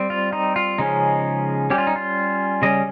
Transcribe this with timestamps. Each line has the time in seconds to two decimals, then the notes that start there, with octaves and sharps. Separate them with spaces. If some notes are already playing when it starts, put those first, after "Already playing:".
Already playing: G3 C4
0.10 F4
0.33 D#4
0.56 F4
0.78 C#3 F3 G#3 C#4 D#4
1.70 G3 C#4 G4
1.78 F4
1.87 D#4
1.96 F4
2.62 C#3 G3 C#4 D#5